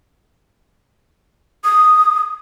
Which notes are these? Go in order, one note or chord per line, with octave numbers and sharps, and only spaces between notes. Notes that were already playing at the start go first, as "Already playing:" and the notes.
D#6